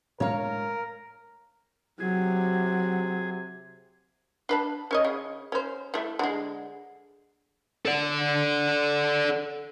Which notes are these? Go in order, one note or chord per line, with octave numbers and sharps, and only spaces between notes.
A2 G#3 D4 A#4 C#5 F5
C3 F#3 G#4
D4 B4 A5
C#4 C#5 D#5
C#3
C#4 C5
E3 A3
D3 G#3
A4 D5